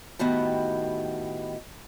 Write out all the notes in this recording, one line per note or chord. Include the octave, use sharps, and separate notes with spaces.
A2 D#3 B3 F#4 G4